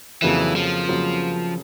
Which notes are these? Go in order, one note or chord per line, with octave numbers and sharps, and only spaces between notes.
F2 C#3 E3 F#3 A#3
F3
F2 C#3 F#3 A#3